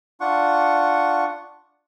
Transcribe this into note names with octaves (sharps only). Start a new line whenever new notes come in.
D4 F4 F#5 C#6